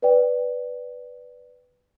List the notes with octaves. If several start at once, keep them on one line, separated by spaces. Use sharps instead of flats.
B4 D5 G5